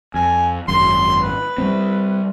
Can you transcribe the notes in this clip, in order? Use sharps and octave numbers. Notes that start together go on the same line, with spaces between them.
F2 G#5
G#1 F#2 C6
B4
G3 G#3 C4